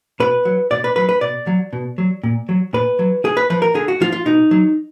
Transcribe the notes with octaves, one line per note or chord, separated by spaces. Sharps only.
B2 B4
F#3
B2 D5
B4
F#3 B4
B4
B2 D5
F#3
B2
F#3
A#2
F#3
A#2 B4
F#3
D3 G#4
B4
F3 B4
A#4
D3 G#4
F#4
F3 F4
F4
B2 D#4
F#3